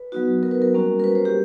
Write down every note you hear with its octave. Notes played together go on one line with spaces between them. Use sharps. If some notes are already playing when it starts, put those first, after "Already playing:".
Already playing: B4
F#3 B3 D#4 F#4
A#4
B4
A#4
G3 A#3 C#4 F#4
A#4
B4
C5
G4